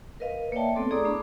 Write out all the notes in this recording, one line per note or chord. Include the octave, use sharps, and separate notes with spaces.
A#4 B4 D#5 F5
A#3 C#5 D5 E5 G5 A5
A3 B3 C4 A4 C6 D6
E4 G#4 D5 A#5 D6 D#6
A3 D4 B5 C#6